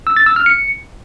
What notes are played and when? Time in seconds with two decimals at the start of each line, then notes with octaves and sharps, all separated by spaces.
0.07 E6
0.17 A6
0.26 E6
0.36 F6
0.46 C#7